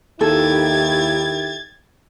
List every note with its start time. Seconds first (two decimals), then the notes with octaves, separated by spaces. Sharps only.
0.21 D#2 D#3 E4 G4 A4 G#6 A6